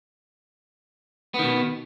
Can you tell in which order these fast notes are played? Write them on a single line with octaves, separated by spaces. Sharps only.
B3 D#3 B2